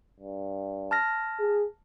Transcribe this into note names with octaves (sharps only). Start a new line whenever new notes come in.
G2
A5 F6 A#6
G#4